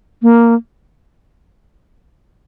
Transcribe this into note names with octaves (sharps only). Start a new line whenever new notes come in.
A#3